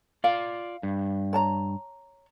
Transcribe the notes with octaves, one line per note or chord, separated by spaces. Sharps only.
F4 D5 F5
G2
C#5 A5 A#5